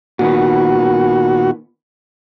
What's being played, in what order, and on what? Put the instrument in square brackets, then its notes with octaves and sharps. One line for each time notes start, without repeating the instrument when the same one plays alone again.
[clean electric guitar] A#2 D#3 B3 [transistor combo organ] F#4